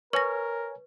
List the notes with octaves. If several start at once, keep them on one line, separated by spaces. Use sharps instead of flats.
A#4 B4 C#5 G#5 C#6 A#6